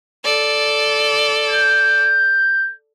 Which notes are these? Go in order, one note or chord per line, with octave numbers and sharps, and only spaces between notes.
A4 D5
G6